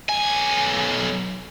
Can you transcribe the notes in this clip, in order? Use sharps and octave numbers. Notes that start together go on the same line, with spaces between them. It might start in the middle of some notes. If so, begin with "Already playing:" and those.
B1 G#5